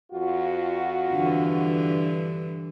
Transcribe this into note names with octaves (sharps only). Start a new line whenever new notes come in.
F2 F4 F#4
G2 D3 E3